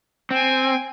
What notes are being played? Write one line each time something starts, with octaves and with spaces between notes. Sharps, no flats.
C4 G5 G#5